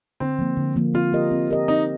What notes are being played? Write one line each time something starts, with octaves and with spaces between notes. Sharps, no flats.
D3 C4
F3 A#3
D3
F3 A#3
C4 F4
G4 A#4 D#5
C4
G4 A#4 D#5
C4 D#4